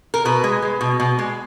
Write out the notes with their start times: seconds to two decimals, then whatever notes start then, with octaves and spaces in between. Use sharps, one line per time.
0.14 A#4
0.25 B2 B4
0.44 G#3
0.62 G#3
0.81 B2
1.00 B2
1.19 G#3